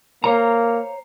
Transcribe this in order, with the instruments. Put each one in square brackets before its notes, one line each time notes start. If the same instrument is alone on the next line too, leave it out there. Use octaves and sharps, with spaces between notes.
[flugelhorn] A#3 [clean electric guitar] C5 C#5 A#5